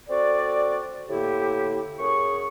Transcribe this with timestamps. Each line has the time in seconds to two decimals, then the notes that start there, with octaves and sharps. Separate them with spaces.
0.08 C4 F#4 A4 D5
1.10 A2 D3 A#3 E4 G4
1.99 F#2 G#4 C#6